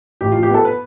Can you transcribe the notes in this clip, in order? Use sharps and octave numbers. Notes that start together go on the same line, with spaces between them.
A1 G4
F3 F4
G4
B3 A4
B4